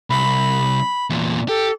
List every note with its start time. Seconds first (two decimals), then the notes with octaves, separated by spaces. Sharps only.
0.10 C2 B5
1.10 E2 A#2
1.49 G4 A4